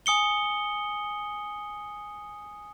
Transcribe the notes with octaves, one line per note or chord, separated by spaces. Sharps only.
G#5 D#6 C#7 G7